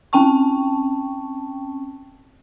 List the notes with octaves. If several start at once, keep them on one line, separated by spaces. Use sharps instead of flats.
C4 C#4 G5 A5 C#6